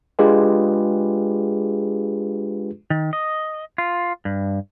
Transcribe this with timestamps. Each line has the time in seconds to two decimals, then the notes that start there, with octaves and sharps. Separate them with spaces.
0.19 G#3 D4 F4 G4 G#4 B4
2.90 D#3
3.13 D#5
3.78 F4
4.25 G2